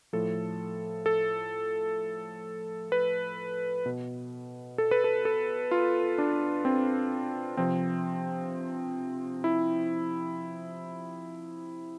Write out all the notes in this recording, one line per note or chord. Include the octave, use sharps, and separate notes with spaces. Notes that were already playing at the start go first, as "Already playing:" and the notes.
A2 F3 A4
A4
B4
B2
A4
B4
A4
A4
F4
D4
C4
C3 F3 C4
E4